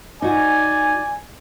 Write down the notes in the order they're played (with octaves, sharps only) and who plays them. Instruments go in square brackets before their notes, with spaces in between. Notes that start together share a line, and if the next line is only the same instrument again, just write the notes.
[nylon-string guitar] D#4 F#4 [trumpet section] D5 G#5